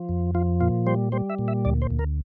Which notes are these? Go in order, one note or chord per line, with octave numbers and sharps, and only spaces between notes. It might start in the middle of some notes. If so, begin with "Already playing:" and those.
Already playing: F3
F2
F3 F4
A#2 F4
G3 C5
G3 C5
E5
A#2
E5
D2 D5
C5
D2
A#4